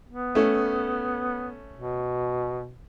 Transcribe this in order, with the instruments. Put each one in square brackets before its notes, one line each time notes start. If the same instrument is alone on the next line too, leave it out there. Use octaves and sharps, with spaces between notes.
[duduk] B3
[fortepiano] A3 C#4
[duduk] B2